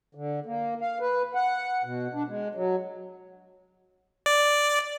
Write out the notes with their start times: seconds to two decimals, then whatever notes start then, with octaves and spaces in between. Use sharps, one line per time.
0.15 D3
0.46 A#3
0.81 F5
1.00 B4
1.35 F#5
1.84 B2
2.13 D4
2.28 G#3
2.55 F#3
4.26 D5